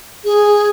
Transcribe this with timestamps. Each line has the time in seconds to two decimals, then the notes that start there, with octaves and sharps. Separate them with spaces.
0.25 G#4